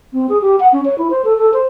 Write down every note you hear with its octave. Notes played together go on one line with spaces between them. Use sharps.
C4
G#4
G4
F#5
C#4
C#5
E4
C5
A4
A4
C5